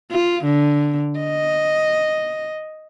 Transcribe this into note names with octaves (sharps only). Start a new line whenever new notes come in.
F4
D3
D#5